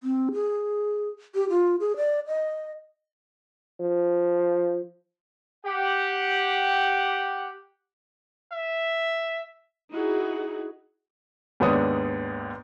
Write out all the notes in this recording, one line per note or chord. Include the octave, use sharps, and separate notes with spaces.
C4
G#4
G4
F4
G#4
D5
D#5
F3
G4 F#5
E5
D#4 E4 F#4 G#4
D#2 G#2 B3 D4 C#5 D#6